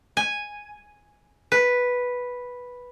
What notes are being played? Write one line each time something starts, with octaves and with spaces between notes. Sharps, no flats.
G#5
B4